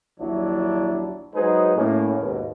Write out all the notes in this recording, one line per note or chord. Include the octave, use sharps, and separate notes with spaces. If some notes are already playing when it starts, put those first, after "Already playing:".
A#1 D#2 F#3 D4 E4
F#3 G#3 D#4 G#4 B4 C5
A2 A#3 C#4
D#2 G#2 B2